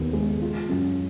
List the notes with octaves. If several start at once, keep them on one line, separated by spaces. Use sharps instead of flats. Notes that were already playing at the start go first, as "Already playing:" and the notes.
Already playing: D#2 B3
G#3
F4
F#2